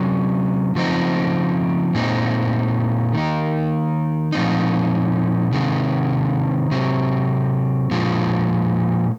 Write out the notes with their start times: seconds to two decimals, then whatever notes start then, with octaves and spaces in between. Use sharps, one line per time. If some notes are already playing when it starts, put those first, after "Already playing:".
Already playing: C3 F#3 C#4
0.75 C#3 F3 C4 D#4
1.95 A#2 G#3 C4 D#4
3.13 D#3 A#3 D#4
4.32 A#2 F3 C4 D#4
5.53 C3 D#3 G#3
6.71 C3 F#3 C4
7.91 A#2 F3 G#3